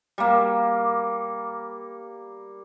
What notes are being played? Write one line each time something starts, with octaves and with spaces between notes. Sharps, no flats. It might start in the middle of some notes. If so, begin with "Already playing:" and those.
G3 A#3